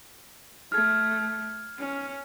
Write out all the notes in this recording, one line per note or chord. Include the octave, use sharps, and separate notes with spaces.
A3 F6 G#6
C#4